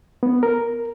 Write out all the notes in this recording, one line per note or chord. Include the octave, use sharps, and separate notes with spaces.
B3
A#4